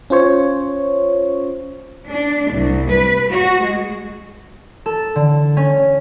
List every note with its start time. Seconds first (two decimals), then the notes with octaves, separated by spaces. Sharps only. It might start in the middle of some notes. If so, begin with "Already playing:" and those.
0.10 C#4 F4 C5 C#5
2.08 D4
2.51 C2
2.89 B4
3.31 F#4
3.63 G#3
4.86 A4
5.16 D3
5.57 C#4